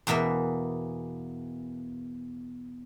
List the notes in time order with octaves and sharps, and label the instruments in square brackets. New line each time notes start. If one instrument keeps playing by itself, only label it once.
[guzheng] E2 B2 E3 A#3 E5